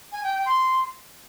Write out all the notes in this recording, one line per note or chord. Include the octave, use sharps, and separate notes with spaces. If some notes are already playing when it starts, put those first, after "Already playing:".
G#5
G5
G5
C6